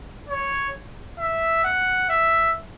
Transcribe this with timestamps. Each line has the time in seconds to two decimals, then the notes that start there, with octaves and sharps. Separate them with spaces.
0.29 C#5
1.19 E5
1.64 F#5
2.09 E5